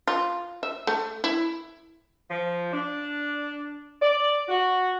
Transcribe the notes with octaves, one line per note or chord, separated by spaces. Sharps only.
F4
E5
A3
E4
F3
D4
D5
F#4